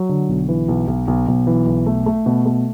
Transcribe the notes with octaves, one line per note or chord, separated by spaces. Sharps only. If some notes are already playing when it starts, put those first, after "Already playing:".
Already playing: F#3
D3
B1
E3
B1
B1
B1
B1
E3
B1
A3
A3
B2
A3